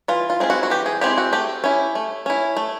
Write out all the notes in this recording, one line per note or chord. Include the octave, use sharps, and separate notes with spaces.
E3 F4
F4
G#3 C4 E4
F#4
F#4
E3 G4
G#4
G#3 C4 E4 G4
F#4
A3 G4
C#4 E4
A3
C#4 E4
A3